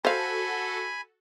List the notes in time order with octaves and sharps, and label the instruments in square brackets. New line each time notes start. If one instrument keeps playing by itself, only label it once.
[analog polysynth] F#4 A4 [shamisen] C5 F5 [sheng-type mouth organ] G#5 B5